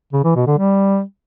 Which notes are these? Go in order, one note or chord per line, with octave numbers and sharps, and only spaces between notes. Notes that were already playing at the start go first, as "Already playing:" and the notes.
C#3
E3
B2
D3
G3